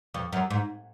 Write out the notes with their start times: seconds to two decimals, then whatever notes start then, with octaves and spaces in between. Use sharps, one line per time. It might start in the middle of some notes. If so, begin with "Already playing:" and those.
0.14 F2
0.33 F#2
0.50 G#2